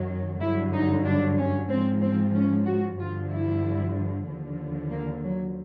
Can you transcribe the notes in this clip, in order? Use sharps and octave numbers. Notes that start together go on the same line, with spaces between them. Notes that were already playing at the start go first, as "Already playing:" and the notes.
Already playing: F#2 D#3 F#3
G2 D3 F#3 E4
D#4
D4
C#4
G#2 F3 C4
C4
C#4
F#4
G2 D3 F3 F4
E4
D#2 D3 F3
A#3
F#3